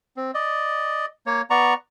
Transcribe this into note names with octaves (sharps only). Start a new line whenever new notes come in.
C4
D5 D#5
A#3 C#5
B3 D5 A#5 C#6